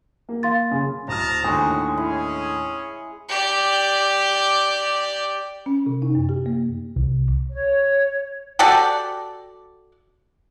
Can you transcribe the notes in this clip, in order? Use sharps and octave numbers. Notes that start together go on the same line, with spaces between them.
A#3
F5 C6 A6
C#3
D1 A5 A#5 D#6 F6
D#2 A2 D3 G#3 D#4 F#4 G#4
C#4 E4 G#4
G4 D5
C#4
C3
D#4
F#2
G4
A#3
C2
C#5
F#4 G4 A4 D5